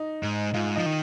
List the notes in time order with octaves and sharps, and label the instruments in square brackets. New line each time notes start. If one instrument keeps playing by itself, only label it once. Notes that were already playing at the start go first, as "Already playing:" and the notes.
Already playing: [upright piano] D#4
[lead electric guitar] G#2
[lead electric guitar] G#2 [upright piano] F4
[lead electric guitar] F3 [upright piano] D#4
[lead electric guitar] D#3